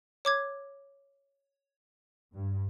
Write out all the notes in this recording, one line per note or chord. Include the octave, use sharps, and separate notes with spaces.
C#5 D6 G#6
G2